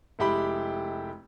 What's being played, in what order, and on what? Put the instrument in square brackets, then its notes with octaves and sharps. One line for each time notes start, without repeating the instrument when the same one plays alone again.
[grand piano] F1 G#3 E4 G4 G5 B5